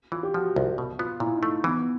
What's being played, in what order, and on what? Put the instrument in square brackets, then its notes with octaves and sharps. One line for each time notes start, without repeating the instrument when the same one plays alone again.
[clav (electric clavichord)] E3 [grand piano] F4
[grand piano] G4
[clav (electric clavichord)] F3 [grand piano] F#4
[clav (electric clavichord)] C2 [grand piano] F4
[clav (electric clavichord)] B2
[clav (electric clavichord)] B3 [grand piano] F4
[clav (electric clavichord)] A#2 [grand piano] E4
[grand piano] D#4
[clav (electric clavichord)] A3
[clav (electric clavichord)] E3 [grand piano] B3